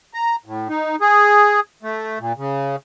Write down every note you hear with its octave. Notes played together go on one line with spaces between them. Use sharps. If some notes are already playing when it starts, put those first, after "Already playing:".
A#5
A2
D#4
G#4
A3
A#2
C#3